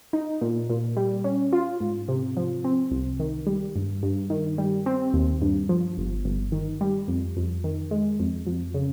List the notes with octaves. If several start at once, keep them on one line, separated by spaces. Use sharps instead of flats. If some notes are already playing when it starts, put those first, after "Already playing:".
D#4
A#2
A#2
G3
C#4
F4
G#2
C3
F3
C4
C2
D#3
G3
G2
G2
D#3
G3
C4
D#2
G2
F3
G1
G1
D#3
G3
F2
F2
D#3
G#3
F2
F2
C#3